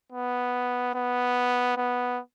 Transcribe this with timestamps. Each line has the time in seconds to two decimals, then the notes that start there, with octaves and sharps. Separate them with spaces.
0.12 B3
0.95 B3
1.77 B3